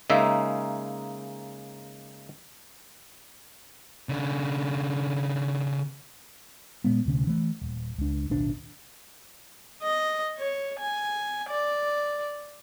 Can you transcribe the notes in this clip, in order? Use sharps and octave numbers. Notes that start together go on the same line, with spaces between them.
C#3 G#3 A#3 D#4 E5
C#3 D4
A#2 G#3 B3
D#1 D2 C3 C#4
E3 A3
D#1
C#2 D4
A1 D#2 B2 D4
D#5
C#5
G#5
D5